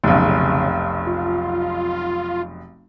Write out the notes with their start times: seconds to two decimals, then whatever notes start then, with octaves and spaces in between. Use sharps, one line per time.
0.04 F1 B1 C#3
1.07 F4